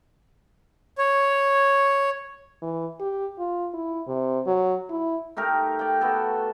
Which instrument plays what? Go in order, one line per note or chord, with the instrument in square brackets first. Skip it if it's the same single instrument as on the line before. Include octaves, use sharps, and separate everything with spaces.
[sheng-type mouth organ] C#5
[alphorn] E3
G4
F4
E4
C3
F#3
E4
[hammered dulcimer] A3 D#4 G4 A#4
D5 G5
B3 F#4 A4